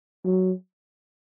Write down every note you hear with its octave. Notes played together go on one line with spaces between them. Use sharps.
F#3